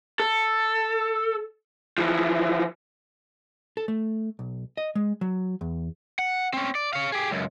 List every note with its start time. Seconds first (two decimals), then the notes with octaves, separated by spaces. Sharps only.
0.20 A4
1.98 E3 F3
3.77 A4
3.88 A3
4.39 B1
4.77 D#5
4.95 G#3
5.21 F#3
5.61 E2
6.19 F#5
6.53 C4 C#4
6.75 D5
6.93 C#5 F5
7.12 G4 G#4
7.31 C#2 F#2